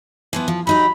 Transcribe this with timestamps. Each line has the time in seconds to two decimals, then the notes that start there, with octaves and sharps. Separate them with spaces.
0.33 E3 F3 B3
0.48 F3
0.67 F#3 D#4 G4 B5